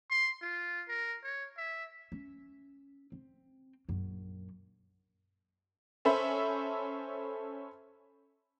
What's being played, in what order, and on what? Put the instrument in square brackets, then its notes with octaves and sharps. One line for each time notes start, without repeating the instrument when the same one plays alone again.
[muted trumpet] C6
F4
A#4
C#5
E5
[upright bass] C#4
C4
A#1 F#2
[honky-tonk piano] C#4 A4 C5 E5 B5